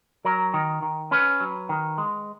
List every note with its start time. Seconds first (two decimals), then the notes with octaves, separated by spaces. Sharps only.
0.25 F#3 A#4
0.54 D#3
0.82 D#3
1.11 C#4 B4
1.40 F#3
1.69 D#3
1.98 G#3